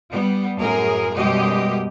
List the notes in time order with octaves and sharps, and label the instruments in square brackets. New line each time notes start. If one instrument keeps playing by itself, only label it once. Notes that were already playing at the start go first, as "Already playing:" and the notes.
[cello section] G3 B3
F#2 A2 G#4 A#4
F#2 B2 G3 G#3 G4 D#5